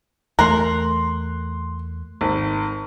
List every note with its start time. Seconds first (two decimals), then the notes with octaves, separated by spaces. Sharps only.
0.39 E2 A3 A#4 C6 F#6
2.21 G#1